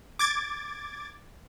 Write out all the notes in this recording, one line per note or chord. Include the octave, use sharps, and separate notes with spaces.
D6 G#6 A6